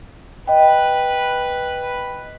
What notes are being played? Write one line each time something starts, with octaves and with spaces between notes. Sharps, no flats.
B4 D#5 G5